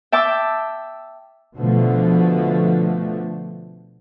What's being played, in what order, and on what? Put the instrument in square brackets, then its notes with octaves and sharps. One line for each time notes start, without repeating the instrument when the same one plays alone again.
[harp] E5 G5 A5 D6 E6
[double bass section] B2 D3 F3 A3